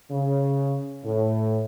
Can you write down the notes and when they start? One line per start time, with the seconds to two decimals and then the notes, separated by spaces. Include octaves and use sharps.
0.11 C#3
1.04 A2